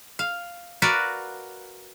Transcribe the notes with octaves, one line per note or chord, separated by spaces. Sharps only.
F5
F#4 A#4 B4 D5 F5